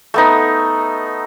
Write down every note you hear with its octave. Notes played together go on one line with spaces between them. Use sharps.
A3 B3 D#4